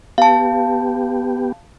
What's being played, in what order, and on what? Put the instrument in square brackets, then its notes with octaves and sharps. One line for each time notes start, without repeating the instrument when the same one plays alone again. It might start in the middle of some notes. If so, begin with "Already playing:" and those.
[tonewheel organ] B3 G4 [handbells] F5 A5